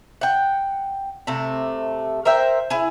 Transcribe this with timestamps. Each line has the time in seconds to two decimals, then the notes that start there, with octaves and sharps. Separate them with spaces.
0.21 F#5 G5
1.27 C3 A3
2.25 A#4 C5 E5 G5
2.70 E4 G#4